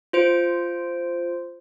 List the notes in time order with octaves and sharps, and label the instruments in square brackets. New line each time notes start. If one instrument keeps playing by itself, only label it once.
[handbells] F4 C5 D7